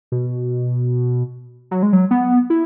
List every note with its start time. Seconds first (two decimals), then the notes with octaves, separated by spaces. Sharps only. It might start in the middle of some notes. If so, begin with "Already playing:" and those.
0.12 B2
1.71 F#3
1.83 G#3
1.93 F#3
2.11 B3
2.50 E4